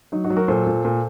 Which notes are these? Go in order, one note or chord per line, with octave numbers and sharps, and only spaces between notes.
F#3 D#4
D#4 F#4
F#3
F#4 A#4
A#2 A4 C5
A#2
A#2